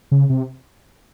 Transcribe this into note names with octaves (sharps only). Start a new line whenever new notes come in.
C#3
C3